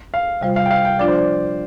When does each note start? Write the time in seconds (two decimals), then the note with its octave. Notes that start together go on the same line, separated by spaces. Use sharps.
0.14 F5
0.41 C3 G3 F4 C5 F5
0.56 F5
0.66 G5
0.71 F5
0.85 G5
0.99 F3 D4 F4 D5
1.08 C5
1.17 D5